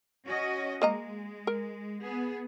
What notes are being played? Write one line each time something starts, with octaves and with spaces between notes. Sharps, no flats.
C#4 F#4 D#5
G#3 A#3 D#5 A#5
A#4
B3 G#4